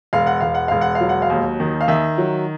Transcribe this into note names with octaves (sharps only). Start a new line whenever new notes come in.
E1 F5
F#5
E1 F5
F#5
E1 F5
F#5
F5
F#3
F#5
F5
D#2
D#3
F5
D#3 E5
F#3